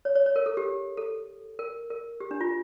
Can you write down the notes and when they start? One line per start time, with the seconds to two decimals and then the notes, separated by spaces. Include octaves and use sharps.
0.05 C#5
0.15 C#5
0.26 C#5
0.36 A#4
0.46 A4
0.57 G4
0.97 A4
1.59 A#4
1.90 A#4
2.20 G4
2.31 D4
2.41 F4